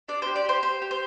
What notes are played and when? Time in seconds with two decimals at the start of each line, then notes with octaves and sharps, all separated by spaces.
0.08 D4 D5
0.22 G4 C5
0.36 D5
0.45 G4 C5
0.62 G4 C5
0.82 G4
0.91 C5